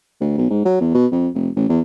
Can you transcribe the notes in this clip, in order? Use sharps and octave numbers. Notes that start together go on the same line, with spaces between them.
D2
B1
G#2
F#3
E2
B2
F2
F1
A1
E2